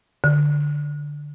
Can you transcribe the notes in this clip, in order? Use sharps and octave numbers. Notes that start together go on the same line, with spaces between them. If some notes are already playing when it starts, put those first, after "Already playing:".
D3